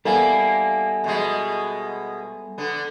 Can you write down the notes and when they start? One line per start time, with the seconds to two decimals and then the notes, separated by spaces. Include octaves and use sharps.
0.05 G3 A#3 B3 E4 A4 G#5
1.04 B2 G#3
2.58 D3 B3